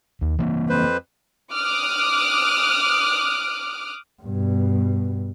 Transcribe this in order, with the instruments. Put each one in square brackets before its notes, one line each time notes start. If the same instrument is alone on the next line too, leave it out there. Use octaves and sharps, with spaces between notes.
[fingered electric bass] D#2
E3 A#3 C4
[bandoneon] F2 B4 C5
[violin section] D6 D#6 F6 F#6 D7
[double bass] G2 B2